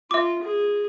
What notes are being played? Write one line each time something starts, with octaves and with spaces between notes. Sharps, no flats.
F4 E5 D6
G#4